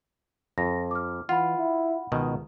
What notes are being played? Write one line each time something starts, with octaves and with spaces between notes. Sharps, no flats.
F2 A#6
D6 F6
E3 F4 F#5 B5
E4
C#2 B2 D#3